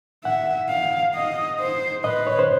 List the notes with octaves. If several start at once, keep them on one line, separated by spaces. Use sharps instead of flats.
E5 F#5
F5
D#5
C5
B4 D#5
C#5
C5